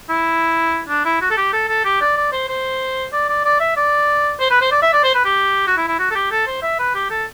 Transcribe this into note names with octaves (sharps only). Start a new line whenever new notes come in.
E4
D4
E4
F#4
A4
G4
A4
A4
G4
D5
D5
C5
C5
D5
D5
D5
E5
D5
C5
B4
C5
D5
E5
D5
C5
B4
G4
F#4
E4
E4
F#4
A4
G4
A4
C5
E5
B4
G4
A4